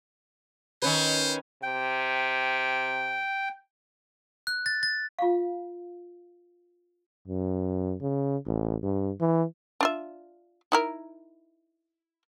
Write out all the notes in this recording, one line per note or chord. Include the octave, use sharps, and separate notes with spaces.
D#3 C#4 B4 C5
C3 G5
F#6
A6
A6
F4 F5
F#2
C#3
A1
G2
E3
D4 F4 E5
D#4 E4 A#4